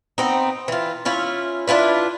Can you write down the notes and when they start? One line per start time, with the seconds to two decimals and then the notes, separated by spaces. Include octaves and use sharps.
0.18 B3 C4 D#4
0.68 E3 F4
1.05 C#4 E4 F4
1.68 D4 E4 F4 B4